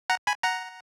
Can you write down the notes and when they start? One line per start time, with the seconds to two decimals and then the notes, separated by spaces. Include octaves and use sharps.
0.10 F#5 A#5
0.27 G#5 B5
0.43 F#5 A#5